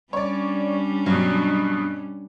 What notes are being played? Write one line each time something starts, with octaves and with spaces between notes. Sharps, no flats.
G3 C#4 D4 C#5 D5
G2 B2 F#3